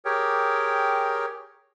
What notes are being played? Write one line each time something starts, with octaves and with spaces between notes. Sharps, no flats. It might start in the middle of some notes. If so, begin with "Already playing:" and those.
G4 G#4 A#4 C#5 G5